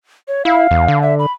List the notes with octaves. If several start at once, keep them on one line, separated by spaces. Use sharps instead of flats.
C#5
E4 F5
E2
D3
E5
B5